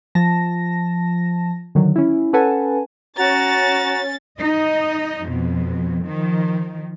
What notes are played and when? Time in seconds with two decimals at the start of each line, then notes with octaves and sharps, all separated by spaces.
0.15 F3 A5 A#6
1.75 D3 D#3 F#3
1.96 C#4 E4
2.33 C#4 A4 B4 F#5 G#5 A5
3.18 C#4 F#4 A#5 A6
4.37 D#4 D#5
5.26 F2 B2
6.04 D#3 F3